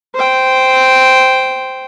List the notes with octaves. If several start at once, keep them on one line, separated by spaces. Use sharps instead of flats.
C5 G5